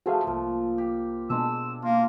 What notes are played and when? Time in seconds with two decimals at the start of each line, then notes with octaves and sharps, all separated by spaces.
0.06 F3 A3 F#4 G#4 F5
0.27 C2 A#2
0.78 G4
1.30 B2 G#3 D4 E6
1.82 A#3 F4